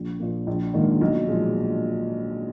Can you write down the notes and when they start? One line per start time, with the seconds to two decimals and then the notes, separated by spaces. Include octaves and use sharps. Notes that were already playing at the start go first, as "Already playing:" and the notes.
Already playing: A#1
0.19 A#2 F3 A#3
0.47 A#1
0.73 G#2 D#3 A#3 D4
1.01 B1
1.28 A#2 F3 G#3